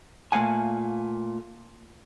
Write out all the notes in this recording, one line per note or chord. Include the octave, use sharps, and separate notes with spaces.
A#2 A3 F5 F#5 G#5